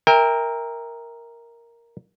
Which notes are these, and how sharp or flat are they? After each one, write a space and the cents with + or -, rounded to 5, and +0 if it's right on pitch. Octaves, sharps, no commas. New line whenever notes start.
A#4 +0 E5 -25 G5 +35